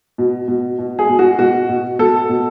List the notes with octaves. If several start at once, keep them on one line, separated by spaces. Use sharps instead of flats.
B2
B2
B2
G#4
B2
F#4
B2 F#4
B2
B2 A4
B2